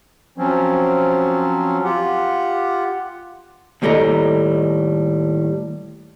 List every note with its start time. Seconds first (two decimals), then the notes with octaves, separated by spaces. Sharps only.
0.38 F3 F#3 C4 C#4
1.84 F4 G4 F#5
3.82 D#2 A2 G3 A4 D#5 A#5